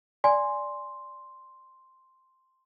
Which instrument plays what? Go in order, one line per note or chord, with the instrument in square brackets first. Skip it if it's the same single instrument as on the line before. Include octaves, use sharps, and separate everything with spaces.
[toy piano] D5 G#5 [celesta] C6